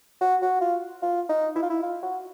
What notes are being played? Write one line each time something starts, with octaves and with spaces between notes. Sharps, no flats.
F#4
F#4
F4
F4
D#4
E4
F4
E4
F4
F#4